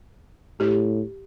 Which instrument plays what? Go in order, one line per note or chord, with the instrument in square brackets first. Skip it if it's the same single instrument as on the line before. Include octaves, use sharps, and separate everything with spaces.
[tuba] A2 [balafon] G4